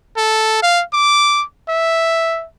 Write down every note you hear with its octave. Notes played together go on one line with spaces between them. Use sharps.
A4
F5
D6
E5